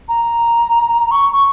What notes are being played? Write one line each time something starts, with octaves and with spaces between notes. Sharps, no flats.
A#5
C#6
C#6